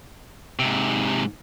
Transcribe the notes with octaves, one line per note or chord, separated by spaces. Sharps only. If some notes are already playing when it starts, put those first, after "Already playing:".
G#2 C3